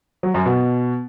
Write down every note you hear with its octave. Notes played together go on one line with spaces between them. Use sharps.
F#3
F#2
B2